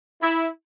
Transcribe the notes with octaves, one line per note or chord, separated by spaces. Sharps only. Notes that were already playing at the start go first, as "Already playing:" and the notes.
E4